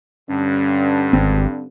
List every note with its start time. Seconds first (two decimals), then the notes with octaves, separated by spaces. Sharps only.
0.29 G2 D3 C#4
1.13 G#1 C4